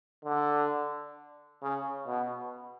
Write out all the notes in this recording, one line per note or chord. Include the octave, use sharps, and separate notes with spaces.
D3
C#3
B2